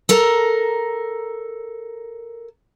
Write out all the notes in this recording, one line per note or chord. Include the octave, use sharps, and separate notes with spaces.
A4 A#4 A#5